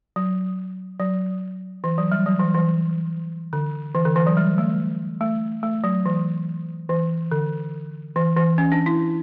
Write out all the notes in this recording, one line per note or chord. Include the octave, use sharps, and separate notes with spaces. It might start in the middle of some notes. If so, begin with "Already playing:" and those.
F#3
F#3
E3
F#3
G3
F#3
E3
E3
D3
E3
D3
E3
F#3
G3
A3
A3
A3
F#3
E3
E3
D3
E3
E3
C#4
D4
E4